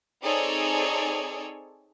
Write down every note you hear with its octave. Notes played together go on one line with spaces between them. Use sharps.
C4 D#4 G#4 A4 C#5 D5